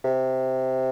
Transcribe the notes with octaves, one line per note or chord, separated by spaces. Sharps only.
C3